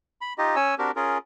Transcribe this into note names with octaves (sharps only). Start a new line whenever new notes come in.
B5
D#4 F4 G4 D#5
C#4 C#5 G#5 E6
C4 D4 F#4 G4 A#4
C#4 F4 G#4 A#4